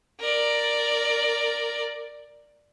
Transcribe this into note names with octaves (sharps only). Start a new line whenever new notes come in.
A#4 D5